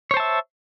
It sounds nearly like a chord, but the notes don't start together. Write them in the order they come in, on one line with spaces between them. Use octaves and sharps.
C#5 C5 A5 E5